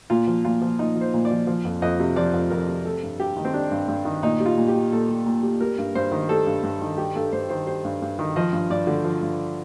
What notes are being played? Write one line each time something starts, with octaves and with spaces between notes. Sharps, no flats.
A#2 F4
F3
A#2 F4
F3
A#2 D#4
F3
C5
A#2
D5
F3
F3
F2
F2 D#5
C3
F3 D5
F2
F2 A#4
C3
G3 A4
G2
G2 G4
D#3
C4
G3 D4
G2
G2
D#3
A#2 D#4
G3
F4
A#2
G4
G3
A#2 A4
G3
A#2
G3
G3 A#4
G2
G2 C5
D#3
G3 A4
G2
G2
D#3
G3 G4
G2 A4
G2 C5
D#3 C5
G3 C5
G2
G2
D#3
F3 D#5
G2
G2 D5
D3
F3
G2